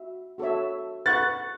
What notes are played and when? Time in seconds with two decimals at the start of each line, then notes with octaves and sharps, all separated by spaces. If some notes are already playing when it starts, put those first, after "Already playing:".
Already playing: F#4 E5
0.38 F#4 A4 C#5 E5
1.06 B4 F#5 C#6 F#6 A6